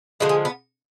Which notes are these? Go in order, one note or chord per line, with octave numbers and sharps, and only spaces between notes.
D3 F3 G#3 F#4
G#4
B3